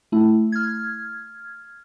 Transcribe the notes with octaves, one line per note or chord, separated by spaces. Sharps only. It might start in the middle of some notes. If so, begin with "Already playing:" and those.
A3 E4
F6 G#6